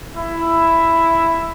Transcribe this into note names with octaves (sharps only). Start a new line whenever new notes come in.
E4